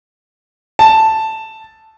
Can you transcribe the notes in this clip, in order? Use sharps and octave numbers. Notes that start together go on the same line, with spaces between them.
A5